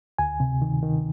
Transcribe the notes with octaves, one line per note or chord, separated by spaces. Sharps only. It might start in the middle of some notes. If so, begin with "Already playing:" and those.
D2 G#5
C3
D#3
D#3